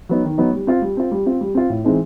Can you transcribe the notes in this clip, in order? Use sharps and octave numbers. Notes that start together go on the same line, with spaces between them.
F#3 B3 D#4
D#3
F#3 B3 D#4
G3
C4 F4
G3
C4 F4
G3
C4 F4
G3
C4 F4
A2
E3 G#3 C4 D#4